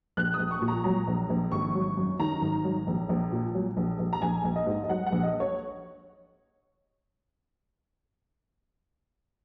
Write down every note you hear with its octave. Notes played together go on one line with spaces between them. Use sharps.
A#1 F#6
D#6
A#1
C#6
A#2
A#5
F#3 A#5
A#1
A#1
G#1 C#6
F#3
F#2
D#3 A#5
G#1
F#3
A#1
A#1
A#2
F#3
A#1
A#1
A#5
A#1 G#5
A#1
D#5
G#2
D#5
F#3 F#5
F#5
A#1
D#5
C#5